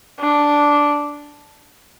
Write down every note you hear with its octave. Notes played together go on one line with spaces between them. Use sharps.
D4